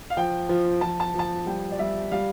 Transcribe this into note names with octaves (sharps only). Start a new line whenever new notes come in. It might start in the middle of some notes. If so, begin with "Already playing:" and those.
F5
F3 G5
F3
F3 A5
A5
F3 A5
G3 G5
D5
G3 E5
G3 F5